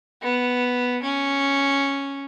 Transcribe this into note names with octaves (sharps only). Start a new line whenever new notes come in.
B3
C#4